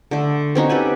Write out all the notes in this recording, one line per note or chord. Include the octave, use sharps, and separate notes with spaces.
D3 A3
C4 C#4 D#4 F#4
G4 A4 B4 G#5